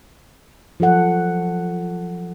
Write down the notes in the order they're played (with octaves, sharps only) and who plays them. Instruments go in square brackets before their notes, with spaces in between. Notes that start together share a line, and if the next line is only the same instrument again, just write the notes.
[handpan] F3 F#3 A4 F#5